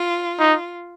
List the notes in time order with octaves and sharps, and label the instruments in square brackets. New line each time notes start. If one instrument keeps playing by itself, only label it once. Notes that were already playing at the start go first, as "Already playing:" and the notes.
Already playing: [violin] F4
[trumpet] D#4